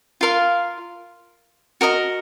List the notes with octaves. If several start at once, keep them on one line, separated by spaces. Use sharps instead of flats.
F4 A#4 F5 C6
F#4 A#4 D#5 A#5